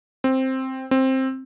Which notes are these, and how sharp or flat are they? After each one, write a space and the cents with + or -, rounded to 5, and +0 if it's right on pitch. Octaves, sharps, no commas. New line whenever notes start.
C4 +5
C4 +10